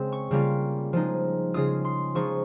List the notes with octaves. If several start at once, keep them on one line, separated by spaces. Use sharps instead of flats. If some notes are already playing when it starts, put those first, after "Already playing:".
Already playing: C#3 G#3 C4
C#6
C#3 G3 A#3 F4
F3 G#3 D#4
C#3 G#3 C#4 F4 D#6
C6
F3 G#3 D#4 C#6